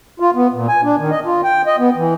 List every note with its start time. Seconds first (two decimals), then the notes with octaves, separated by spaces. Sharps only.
0.20 F4
0.35 B3
0.54 A#2
0.68 G#5
0.83 D4
0.99 D#3
1.11 D#5
1.25 F4
1.44 G5
1.66 D#5
1.78 B3
1.97 E3